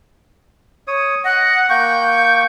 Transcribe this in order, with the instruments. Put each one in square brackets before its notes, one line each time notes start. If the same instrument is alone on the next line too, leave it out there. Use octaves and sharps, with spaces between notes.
[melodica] C#5 D#6
[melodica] D#5 [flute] F#5
[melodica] A#3 G5 C#6 [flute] G6